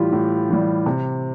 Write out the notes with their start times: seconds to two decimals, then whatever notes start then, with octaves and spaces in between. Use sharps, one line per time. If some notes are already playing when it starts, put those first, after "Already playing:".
Already playing: A2 E3 G3 F4 G4
0.12 A2
0.50 E3 G3
0.86 C3